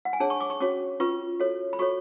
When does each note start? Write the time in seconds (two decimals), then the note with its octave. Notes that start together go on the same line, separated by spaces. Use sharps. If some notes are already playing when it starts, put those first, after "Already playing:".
0.05 F#5
0.13 G#5
0.20 D4 G#4 C#5 A5
0.30 C#6
0.40 D6
0.50 C#6
0.60 C#4 F#4 C#5 D6
1.00 C#4 F4 B4 C#6
1.40 F#4 A4 C#5
1.73 B5
1.79 F#4 A4 C#5 C#6